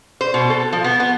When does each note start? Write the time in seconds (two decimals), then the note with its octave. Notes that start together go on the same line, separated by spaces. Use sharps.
0.21 C5
0.34 B2
0.50 A4
0.73 F3
0.84 B3
1.00 B3